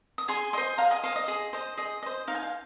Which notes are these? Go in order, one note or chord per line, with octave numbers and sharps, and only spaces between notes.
D#6
G#4 G#5 C6
C5 D#5 G#5 C6
G#4 F5 A#5
D#5 G#5
C5 D#5 F5
D#5
G#4
C5 D#5
G#4 D#5
C5 D#5
D#4 F5
G#5
F5